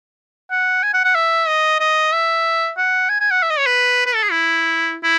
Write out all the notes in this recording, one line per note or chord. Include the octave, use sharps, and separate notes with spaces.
F#5
G#5
F#5
F#5
E5
D#5
D#5
E5
F#5
G#5
G#5
F#5
E5
D#5
C#5
B4
B4
A4
G#4
E4
E4